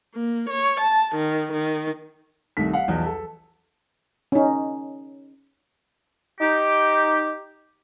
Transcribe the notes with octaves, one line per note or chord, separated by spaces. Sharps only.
A#3
C#5
A5
D#3
D#3
C2 D#3 A3 B6
F5 F#5
B1 E2 F3
A4
C#4 D#4
D#4 G4